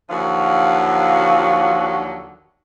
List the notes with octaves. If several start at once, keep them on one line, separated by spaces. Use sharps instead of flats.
D#2 D3 F3 F#3 F#4 F5